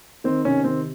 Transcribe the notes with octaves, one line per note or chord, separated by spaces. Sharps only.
D#3 C4
C3 C#4
D#3 C4